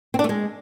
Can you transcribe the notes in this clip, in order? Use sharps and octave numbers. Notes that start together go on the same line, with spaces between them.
C4
D4
A3
G#3